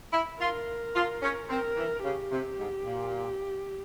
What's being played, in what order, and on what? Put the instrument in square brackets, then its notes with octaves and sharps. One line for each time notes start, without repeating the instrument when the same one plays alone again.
[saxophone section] E4
[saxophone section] F4 [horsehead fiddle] A#4
[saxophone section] F4
C#4
[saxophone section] C4 [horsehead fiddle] A#4
[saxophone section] E3
[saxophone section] C#3 [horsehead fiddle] G4
[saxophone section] C3
G#2
A#2